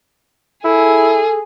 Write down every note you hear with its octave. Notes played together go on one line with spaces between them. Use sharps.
E4 G#4 A4